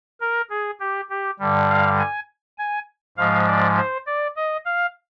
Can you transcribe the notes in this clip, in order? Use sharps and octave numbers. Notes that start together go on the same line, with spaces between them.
A#4
G#4
G4
G4
G2 D3 G3
F5
G#5
G#5
G#2 F3 G#3 F5
D5
C5
D5
D#5
F5